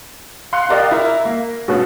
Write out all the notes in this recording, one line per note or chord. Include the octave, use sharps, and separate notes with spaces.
F5 C6 F#6 C#7
G4 A#4 D5 D#5 F5
E4 A#4
A#3
G2 B2 A3 B3 C#4 F#4